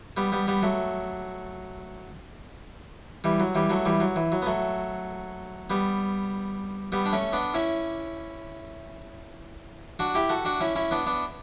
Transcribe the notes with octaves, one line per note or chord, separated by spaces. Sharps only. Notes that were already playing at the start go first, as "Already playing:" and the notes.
G3 B3
G3 B3
G3 B3
F#3 A3
E3 G3
F#3
E3 G3
F#3 A3
E3 G3
F#3
E3
F#3
B3
F#3 A3
G3 B3
G3 B3
D4
A3 C#4
B3 D4
C#4 E4
D4 F#4
E4 G4
F#4 A4
D4 F#4
C#4 E4
C#4 E4
B3 D4
B3 D4